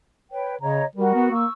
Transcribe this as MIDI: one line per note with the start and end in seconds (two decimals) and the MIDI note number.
0.30 0.55 71
0.30 0.55 73
0.30 0.55 79
0.61 0.82 49
0.61 0.85 73
0.61 0.85 75
0.61 0.85 82
0.96 1.13 55
0.96 1.30 66
0.96 1.30 70
1.14 1.28 59
1.31 1.45 58
1.31 1.53 85
1.31 1.53 88